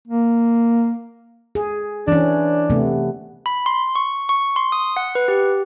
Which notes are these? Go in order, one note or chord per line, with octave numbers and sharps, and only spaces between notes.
A#3
G#4
E3 C#4 D4
C3 A3 B3
B5
C6
C#6
C#6
C6
D#6
F#5
B4
G4